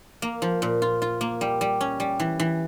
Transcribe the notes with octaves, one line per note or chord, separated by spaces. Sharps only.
A#3
F3
A#2
F4
F4
A#3
G3
G3
C#4
G3
E3
E3